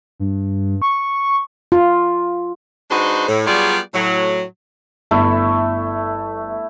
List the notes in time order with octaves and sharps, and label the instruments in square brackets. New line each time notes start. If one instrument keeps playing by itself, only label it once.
[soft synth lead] G2
C#6
[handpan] F4
[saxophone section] G#3 D4 D#4 F#4 B4 C5
A2
F#3 G3 B3 F4 G#4 D5
A2 F#3
[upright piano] G1 [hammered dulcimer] A3 E4